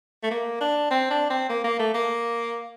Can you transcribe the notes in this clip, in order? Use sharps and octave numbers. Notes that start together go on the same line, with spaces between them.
A3
A#3
D4
C4
D4
C4
A#3
A#3
A3
A#3